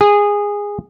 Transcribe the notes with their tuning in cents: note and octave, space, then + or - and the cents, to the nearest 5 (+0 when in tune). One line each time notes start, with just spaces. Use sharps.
G#4 -15